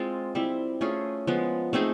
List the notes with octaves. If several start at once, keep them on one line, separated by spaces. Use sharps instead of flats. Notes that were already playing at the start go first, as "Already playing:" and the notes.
Already playing: G#3 C4 F4
G3 C4 E4
A3 C#4 F4 G#4
F3 G#3 B3
A3 C4 D#4 G#4